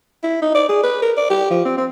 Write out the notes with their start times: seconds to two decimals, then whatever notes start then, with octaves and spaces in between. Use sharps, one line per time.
0.24 E4
0.42 D#4
0.55 D5
0.69 G#4
0.84 B4
1.02 A#4
1.17 D5
1.30 G4
1.51 F3
1.66 C4
1.77 C4